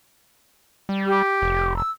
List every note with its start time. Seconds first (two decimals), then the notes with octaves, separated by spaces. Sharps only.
0.89 G3
1.07 G4
1.42 F1
1.77 E6